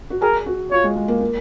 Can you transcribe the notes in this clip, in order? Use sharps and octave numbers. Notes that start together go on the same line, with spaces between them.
F#4
G#4 A#4
F#4
F4 C#5
G#3
G#3
A#3
A#3